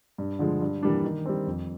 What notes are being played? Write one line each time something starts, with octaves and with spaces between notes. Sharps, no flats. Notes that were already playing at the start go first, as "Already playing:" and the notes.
G2
D3 F3 G#3
G2
E3 G3 A#3 D4
D#3
G3 C4
F2